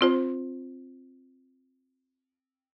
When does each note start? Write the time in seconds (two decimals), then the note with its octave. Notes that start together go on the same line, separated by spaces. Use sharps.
0.01 C4 F4 C5